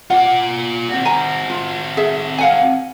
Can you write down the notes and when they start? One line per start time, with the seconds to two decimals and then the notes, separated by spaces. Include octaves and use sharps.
0.10 F4 D5 F#5
0.89 C4 F#4
1.05 G#5 A#5
1.50 F4
1.97 G#4 E5
2.38 F5 F#5 G#5